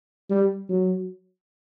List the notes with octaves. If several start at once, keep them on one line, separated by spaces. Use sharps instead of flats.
G3
F#3